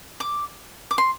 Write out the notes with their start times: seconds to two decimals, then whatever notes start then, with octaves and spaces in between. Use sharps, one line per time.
0.20 D6
0.91 D6
0.98 C6